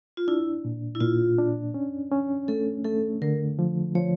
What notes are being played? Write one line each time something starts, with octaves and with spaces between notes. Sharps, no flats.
F4
D4 E4
A#2
E4
A#2 F4
D4
C#4
C#4
A3 A4
A3 A4
D3 A#4
F3
F3 C#5